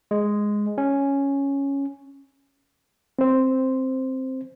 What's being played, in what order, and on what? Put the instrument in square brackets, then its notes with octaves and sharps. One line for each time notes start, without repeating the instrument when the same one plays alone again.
[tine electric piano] G#3
C#4
[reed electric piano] C4 C5